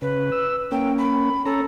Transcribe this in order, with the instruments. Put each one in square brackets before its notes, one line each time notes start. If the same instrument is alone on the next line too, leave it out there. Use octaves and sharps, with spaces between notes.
[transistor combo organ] C#3 [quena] B4
[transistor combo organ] E6
[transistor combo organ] A#3 C#4 [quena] G5
[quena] B5
[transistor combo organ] C#4 A#5 [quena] A4